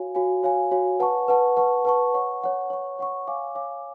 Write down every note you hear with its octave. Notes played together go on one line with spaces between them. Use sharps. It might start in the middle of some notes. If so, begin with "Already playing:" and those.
Already playing: F#4 C#5 F5 G#5
F#4 C#5 F5 G#5
F#4 C#5 F5 G#5
F#4 C#5 F5 G#5
B4 F#5 A5 C#6
B4 F#5 A5 C#6
B4 F#5 A5 C#6
B4 F#5 A5 C#6
C#5 F#5 C#6
C#5 F#5 C#6
C#5 F#5 C#6
C#5 F#5 C#6
C#5 F5 G#5 D6
C#5 F5 G#5 D6